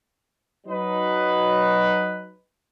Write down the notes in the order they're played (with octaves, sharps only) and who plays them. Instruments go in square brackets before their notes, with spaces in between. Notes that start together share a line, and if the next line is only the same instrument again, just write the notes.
[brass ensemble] F#3 D#4 B4